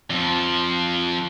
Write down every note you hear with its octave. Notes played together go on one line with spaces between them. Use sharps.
F2 F3